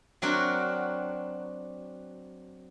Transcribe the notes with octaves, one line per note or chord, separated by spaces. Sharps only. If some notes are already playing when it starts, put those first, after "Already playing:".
F#3 C4 D4 F#4 A#4